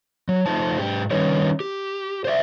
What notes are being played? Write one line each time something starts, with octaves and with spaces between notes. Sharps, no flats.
F#3
F3 A3 D#4 F4 C5 A5
G#2 G4
D#3 G3 C#4 D#4 B4 C#5
G4
C5 D5 E5